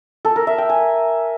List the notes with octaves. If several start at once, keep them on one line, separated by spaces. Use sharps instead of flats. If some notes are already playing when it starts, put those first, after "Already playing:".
A4
A#4
E5
G5
G#5